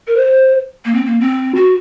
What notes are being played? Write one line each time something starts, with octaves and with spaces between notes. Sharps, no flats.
A#4
C5
A#3
C4
A#3
C4
F#4